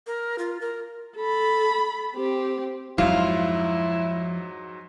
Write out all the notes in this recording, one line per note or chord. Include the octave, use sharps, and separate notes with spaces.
A#4
F4
A#4
A4 B5
C4 G4
F2 G#2 F3 F#3 E4 F4